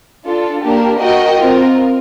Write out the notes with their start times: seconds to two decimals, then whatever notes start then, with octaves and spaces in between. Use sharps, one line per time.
0.26 D4 F4 A4
0.63 A#3 D4 G4 A#4
0.99 F#4 A#4 D#5 G5
1.36 C4 F4 A#4